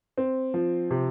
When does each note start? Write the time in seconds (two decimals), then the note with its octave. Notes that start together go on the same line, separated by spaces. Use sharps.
0.18 C4
0.54 F3
0.91 C3